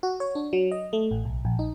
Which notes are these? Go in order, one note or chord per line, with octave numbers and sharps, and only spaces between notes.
F#4
C#5
D4
F#3
D#5
A3
A1
B1
A#1
D#4